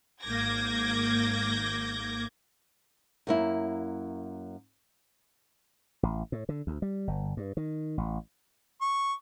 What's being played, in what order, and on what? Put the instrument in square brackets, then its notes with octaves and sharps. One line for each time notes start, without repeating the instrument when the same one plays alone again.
[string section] G#1 A#3 D6 G6 G#6 A#6
[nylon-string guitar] F#2 A#3 E4
[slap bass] A1
A2
D3
D2
G3
G1
G2
D#3
A1
[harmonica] C#6